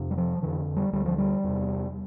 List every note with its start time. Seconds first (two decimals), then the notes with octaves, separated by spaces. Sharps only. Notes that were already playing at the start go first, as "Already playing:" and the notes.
Already playing: F2 C3
0.11 G3
0.18 F3
0.42 F2 D3 E3
0.76 G3
0.93 D2 D3 G3
1.06 F3
1.18 G3
1.44 E2 C3